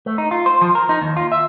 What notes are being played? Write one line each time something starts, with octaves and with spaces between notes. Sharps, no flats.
A3
D#4
F4
C5
F3
A#4
D#4
D#2
F4
E5